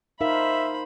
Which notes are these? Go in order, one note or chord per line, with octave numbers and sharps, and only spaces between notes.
D#4 A#4 C5 E5 F5 B5